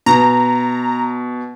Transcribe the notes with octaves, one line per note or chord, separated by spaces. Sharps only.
B2 A#5